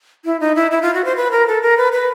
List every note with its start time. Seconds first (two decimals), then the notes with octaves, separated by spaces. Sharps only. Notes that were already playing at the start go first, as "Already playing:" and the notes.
0.25 E4
0.40 D#4
0.55 E4
0.71 E4
0.82 F4
0.94 F#4
1.05 C5
1.16 B4
1.31 A#4
1.47 A4
1.62 A#4
1.77 B4
1.92 B4